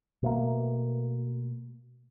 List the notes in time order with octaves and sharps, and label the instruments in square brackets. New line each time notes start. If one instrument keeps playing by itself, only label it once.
[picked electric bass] B2 A3 A#3